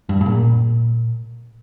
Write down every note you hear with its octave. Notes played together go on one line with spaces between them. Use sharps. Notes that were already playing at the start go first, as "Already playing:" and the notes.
G2
G2
A#2